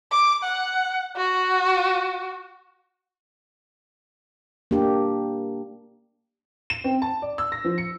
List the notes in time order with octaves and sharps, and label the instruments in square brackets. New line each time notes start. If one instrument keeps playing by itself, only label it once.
[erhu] D6
F#5
F#4
[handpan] A#3 D4 G4
[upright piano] E7
C4
A5
D5
E6
A#6
F3
C#7